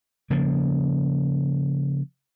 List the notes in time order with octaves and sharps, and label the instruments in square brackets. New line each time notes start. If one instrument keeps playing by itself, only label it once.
[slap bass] C#3 F3 A#3